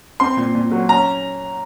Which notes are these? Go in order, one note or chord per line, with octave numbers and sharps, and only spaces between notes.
C4 C6
A#2
A#2
F#3
C#4 A#5